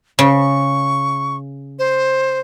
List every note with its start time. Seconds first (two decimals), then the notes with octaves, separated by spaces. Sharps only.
0.19 C#3 C#6
1.79 C5